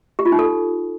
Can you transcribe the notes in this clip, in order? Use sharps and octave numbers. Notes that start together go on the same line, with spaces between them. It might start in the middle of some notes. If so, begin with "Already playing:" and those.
G4
F4
D#4
A4